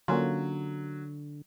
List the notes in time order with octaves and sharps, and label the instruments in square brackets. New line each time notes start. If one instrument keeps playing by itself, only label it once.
[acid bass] D3 [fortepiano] F#3 [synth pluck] A#3 C#4 F4